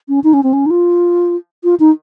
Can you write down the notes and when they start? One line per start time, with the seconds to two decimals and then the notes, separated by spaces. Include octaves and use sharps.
0.09 C#4
0.24 D#4
0.33 C#4
0.43 C4
0.53 C#4
0.66 D#4
0.70 F4
1.64 F4
1.80 D#4